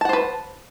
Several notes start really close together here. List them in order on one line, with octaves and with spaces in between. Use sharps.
A5 F#5 C5 B4